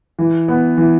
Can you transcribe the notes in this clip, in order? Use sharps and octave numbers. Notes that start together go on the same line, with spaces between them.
E3
B3
E3